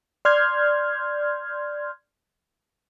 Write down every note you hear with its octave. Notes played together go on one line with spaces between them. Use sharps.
D5 C6 F6 G6 G#6